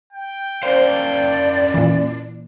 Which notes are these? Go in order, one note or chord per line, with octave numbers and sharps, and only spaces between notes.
G5
C#4 A#4 C5 D5 F5
A#2 E3